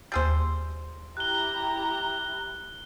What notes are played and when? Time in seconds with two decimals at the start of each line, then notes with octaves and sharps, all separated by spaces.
0.12 D#2 G3 G#4 C5 E6 G6
1.17 E4 G4 A#5 F#6 G7